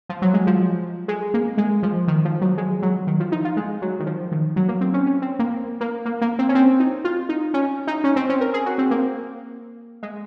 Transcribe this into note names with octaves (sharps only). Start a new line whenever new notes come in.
F3
F#3
G#3
F3
G#3
A#3
G#3
F3
D#3
F3
F#3
G#3
F#3
D#3
F3
D#4
F4
G#3
F#3
D#3
F3
D#3
F#3
A#3
C4
C#4
C#4
C4
A#3
A#3
A#3
A#3
C4
C#4
C4
D#4
F4
D#4
C#4
D#4
C#4
C4
C#4
A#4
G#4
F#4
C4
A#3
G#3